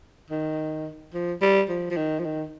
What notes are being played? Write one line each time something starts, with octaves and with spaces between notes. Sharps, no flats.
D#3
F3
G3
F3
F3
D#3
F3
D#3